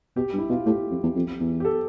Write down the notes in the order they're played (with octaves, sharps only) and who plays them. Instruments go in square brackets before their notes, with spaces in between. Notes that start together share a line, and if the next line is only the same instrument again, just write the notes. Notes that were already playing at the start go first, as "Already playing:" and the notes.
[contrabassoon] B2 [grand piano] G4
[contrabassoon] G2
[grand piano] E4
[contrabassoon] B2 [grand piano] F4
[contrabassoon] A2 [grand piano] G4
[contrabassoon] F2
E2
F2
E2
[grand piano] G4
A4